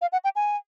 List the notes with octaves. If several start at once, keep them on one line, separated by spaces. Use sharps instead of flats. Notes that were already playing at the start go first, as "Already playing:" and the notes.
F5
F#5
G5
G#5